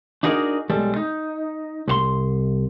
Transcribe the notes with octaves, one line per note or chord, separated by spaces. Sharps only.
D4 D#4 F#4 G#4 A#4 D5
B1 G3 G#3 A4
D#4
C2 F#4 C6